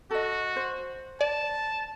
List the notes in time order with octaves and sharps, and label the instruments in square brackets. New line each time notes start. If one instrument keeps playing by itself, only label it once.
[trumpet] F#4 [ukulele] A4 D#5
[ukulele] C5
[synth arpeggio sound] D5 [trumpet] A5